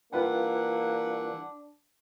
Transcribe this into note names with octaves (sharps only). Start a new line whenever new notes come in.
E3 G3 A#3 D4 F4 B4 F#5 G5